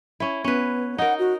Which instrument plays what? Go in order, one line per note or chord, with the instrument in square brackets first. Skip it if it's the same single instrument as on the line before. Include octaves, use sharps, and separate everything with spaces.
[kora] C#4 E4
[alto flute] B3 [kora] C#4 B4
[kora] D#4 A#4 [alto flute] F#5
[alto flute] F#4